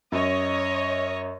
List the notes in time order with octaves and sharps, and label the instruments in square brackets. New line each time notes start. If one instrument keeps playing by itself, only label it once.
[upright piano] F#2 [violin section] C#5 D#5